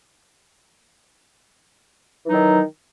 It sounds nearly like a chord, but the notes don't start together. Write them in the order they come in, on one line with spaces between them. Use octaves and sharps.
E3 D#4 F#3 D#3